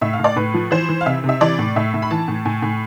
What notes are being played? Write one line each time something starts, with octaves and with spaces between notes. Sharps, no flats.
A2 E5
F5
A2
D5
A2 B4
F3
E3 C5
E3
F5
C3 E5
C3
E5
E3 D5
A2
A2 E5
A2
B5
E3 A5
A2
A2 G#5
A2